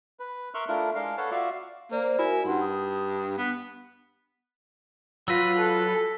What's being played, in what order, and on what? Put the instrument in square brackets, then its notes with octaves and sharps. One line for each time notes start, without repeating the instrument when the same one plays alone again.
[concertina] B4
A#4 E5 C6 C#6 F6 F#6
A3 D4 E4 F4 A#4
G#3 D4 A#4 F5
A4 B4 C#5 F5 F#5 A5
F4 F#4 D5 E5 F5
[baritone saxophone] A#3 [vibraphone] C5 D5
[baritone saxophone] E4 [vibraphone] F#4 A#4 G#5
[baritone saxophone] G2 [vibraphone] D#4 F#5 C6
[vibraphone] D#6
[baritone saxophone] B3
[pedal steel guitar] F#3 B4 [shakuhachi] F4 [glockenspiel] E6 A#6 B6
[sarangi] A4